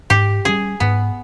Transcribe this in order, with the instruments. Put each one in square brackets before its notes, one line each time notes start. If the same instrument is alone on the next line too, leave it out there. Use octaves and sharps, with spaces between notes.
[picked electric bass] G#2 [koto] G4
[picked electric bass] G3 C#4 [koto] G#4
[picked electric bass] G#2 [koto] B3